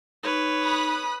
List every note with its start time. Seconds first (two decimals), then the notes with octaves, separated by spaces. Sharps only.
0.23 D#4 G4 B4 C#5
0.63 B5 D#6 F#6